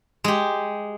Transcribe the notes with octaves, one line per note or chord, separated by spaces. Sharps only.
G#3 G4